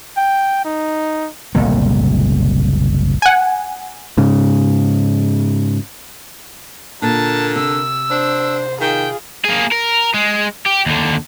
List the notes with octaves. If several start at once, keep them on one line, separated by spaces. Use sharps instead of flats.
G5
D#4
F#1 C2 A#2 A3
F#5 G#5
G#2 C#3
A#2 D3 A#4 A5
C3 E6
D4 C5
D#3 F4 G#4 G5
A#3 G#4
A#4
G#3
G4
D#2 D3